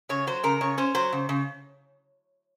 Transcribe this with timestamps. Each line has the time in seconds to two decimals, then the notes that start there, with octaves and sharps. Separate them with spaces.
0.09 C#3 C#5
0.27 F#3 C5
0.43 C#3 A#4
0.61 C#3 C#5
0.78 C#4 C5
0.95 F#3 C5
1.12 C#3
1.29 C#3